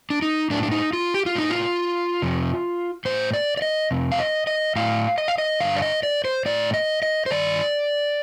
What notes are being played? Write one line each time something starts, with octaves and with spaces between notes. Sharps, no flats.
D4
D#4
A2 D4
D4
D#4
F4
G4
F4
A2 D#4
F4
F2 C3
A2 C5
D5
D5
D#5
F2 C3
F5
D#5
D#5
A2 F5
D#5
F5
D#5
G2 D3 F5
D5
D#5
D5
C5
A2 D5
D#5
D#5
C5
G2 D#3 D5